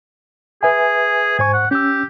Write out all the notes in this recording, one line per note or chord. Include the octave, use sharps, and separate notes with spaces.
G#4 B4 E5 G#5
G#2 C5 G#5 C#6
F#5
C#4 G4 E6